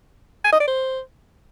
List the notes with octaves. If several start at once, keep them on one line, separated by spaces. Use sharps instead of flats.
G#5
D#5
D5
C5